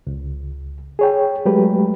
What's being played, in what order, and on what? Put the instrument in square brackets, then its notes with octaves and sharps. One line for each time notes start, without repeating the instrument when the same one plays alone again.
[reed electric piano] C#2
G#4 C#5 G5
F#3 G#3 A3 G4 B4